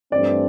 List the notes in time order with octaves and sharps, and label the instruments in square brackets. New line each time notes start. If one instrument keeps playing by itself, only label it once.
[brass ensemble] G2 E3 A3 C4 [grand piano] D5